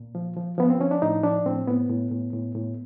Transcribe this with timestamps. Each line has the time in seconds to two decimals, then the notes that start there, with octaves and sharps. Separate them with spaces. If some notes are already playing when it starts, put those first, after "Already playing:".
Already playing: A#2
0.15 F3
0.36 F3
0.58 F3 B3
0.70 C4
0.80 F3 C#4
0.91 D4
1.02 A2 D#4
1.23 F3 D4
1.46 A2 C4
1.67 A2 B3
1.89 A2
2.11 A2
2.33 A2
2.55 A2